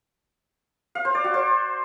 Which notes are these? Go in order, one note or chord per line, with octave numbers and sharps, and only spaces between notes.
F5
C5
D5
F#4
C5